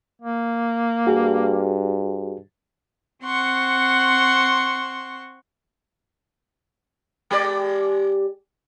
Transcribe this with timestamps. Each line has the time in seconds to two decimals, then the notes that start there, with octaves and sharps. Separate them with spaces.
0.22 A#3
1.07 G2 F#4 G#4
3.25 C4 F#5 C6 C#6
7.31 G#3 G4 D5